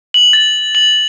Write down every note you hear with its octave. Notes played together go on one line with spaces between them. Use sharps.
F#7
A6
F#7